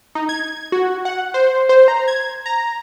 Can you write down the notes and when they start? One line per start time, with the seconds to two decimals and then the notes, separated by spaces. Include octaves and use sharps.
0.15 D#4
0.29 G#6
0.72 F#4
1.05 F#5
1.34 C5
1.69 C5
1.88 A#5
2.08 G#6
2.46 A#5